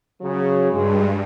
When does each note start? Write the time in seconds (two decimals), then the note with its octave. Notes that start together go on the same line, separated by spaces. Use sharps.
0.21 C#3 F#3
0.71 G2 G#3